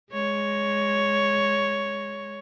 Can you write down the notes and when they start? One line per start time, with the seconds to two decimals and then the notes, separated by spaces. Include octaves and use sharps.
0.12 G#3 C#5